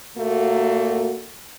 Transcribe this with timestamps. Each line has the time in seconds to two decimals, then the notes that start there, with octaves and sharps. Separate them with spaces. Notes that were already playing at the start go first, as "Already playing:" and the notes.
0.17 A#2 A3 A#3 F#4